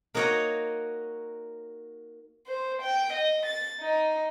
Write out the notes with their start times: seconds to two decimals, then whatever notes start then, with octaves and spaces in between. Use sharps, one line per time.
0.14 A#3 D#4 F#4 C#5 D#5 A#5
2.47 C5
2.82 G5
3.13 D#5
3.46 A6
3.80 D#4